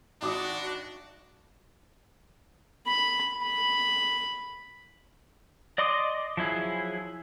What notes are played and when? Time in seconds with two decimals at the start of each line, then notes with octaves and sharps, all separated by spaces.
0.22 G#1 D4 F#4 D6 D#6
2.87 B5
3.44 B5
5.78 D5 D#5 C6 D6 D#6
6.37 F3 F#3 E4 G#4